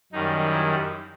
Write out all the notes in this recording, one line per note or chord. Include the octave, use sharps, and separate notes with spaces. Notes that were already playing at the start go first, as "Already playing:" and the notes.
F#2 D#3 G3 D#4
E4